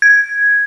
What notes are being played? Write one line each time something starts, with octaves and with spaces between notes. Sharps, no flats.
G#6